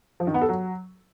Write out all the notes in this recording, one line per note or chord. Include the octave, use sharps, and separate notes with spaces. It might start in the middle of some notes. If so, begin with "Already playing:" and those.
F3
D#3
B3
A4
F#3